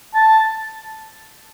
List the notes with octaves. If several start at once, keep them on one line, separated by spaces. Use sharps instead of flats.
A5